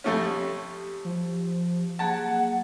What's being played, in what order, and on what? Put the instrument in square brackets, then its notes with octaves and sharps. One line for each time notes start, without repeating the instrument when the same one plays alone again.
[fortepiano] F2 A3 C#4 [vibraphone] G4
[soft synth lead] F3
[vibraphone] F#3 A#3 G#4 [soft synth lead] F#5 [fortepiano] A5